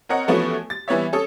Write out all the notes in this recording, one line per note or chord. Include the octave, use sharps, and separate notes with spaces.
C4 A#4 C#5 D#5 F#5
E3 F3 A3 B3 C#4 F#4
A6
E3 G3 B3 E4 C#5 E5
C#4 A4 D#6